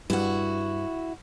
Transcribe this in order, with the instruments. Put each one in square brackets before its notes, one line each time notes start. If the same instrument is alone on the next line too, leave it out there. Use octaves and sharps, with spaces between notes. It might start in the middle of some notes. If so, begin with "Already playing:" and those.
[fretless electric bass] G2 [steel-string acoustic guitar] E4 F#4